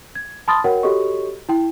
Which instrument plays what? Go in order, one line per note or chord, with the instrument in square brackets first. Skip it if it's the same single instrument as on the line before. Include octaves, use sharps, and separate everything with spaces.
[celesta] G#6
A5 B5 C6 D#6 F6 A6
F#4 A#4 C#5 F#5 G5
F#4 G4 A4 C#5 D#5 C#6
E4 G5